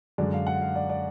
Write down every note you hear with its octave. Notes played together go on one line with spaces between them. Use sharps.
F#2 D3 G#3 D5
F5
F#5
F5
D5
D5